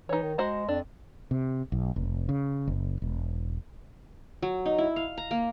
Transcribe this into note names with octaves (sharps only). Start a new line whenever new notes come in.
E3 D#4 C#5
D#3
G#3 F#4 C5 A#5
F2 D4
C3
B1
F1
C#3
F#1
E1
F#3
D#4
E4
F5
A#5
A#3